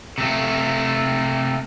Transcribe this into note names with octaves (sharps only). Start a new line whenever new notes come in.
C3 A3